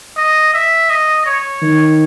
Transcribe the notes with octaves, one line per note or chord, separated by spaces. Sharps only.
D#5
E5
D#5
C#5
D#3